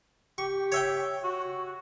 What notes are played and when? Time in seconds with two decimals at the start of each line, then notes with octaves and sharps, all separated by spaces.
0.38 G4 C#6
0.72 C#5 E5 G5
1.23 F#4